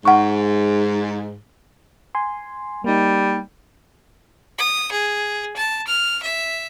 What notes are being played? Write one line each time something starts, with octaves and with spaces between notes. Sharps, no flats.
G#2 F#5 C#6
G#5 C6
G3 A#3 D#4
D#6
G#4
A5
F6
E5